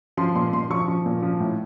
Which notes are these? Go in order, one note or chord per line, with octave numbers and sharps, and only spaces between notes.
F3 C6
A#2 C6
A#2 C6
F3 C#6
F3
A#2
F3
A2